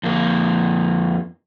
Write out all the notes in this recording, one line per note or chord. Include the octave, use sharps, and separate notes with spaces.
F2 A#3